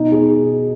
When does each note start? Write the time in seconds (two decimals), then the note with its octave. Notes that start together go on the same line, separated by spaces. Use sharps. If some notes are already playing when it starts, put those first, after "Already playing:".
Already playing: B2 D#4
0.12 G#4